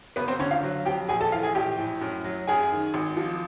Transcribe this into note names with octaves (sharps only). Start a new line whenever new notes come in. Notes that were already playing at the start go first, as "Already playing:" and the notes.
F#1 B3 B4
C4 C5
D3 C#4 C#5
F4 F5
F#3
F2 G4 G5
A#1 G#4 G#5
A4 A5
E3 F4 F5
G#4 G#5
A#1 G4 G5
A2
F#2
F#3
F#2 G#4 G#5
D#3
G#1
F3